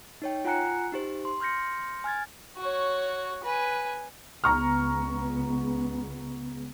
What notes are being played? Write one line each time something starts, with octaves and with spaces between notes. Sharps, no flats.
D#4 C#5 G5
F4 F#5 G#5 A#5 F#6 C#7
D#4 G4 C5
C6
C6 F6 G6 A#6 C#7
G#5 F6 G#6 A6
F#4 C#5
B4 G#5
C#2 G#3 B3 A#5 C#6 F6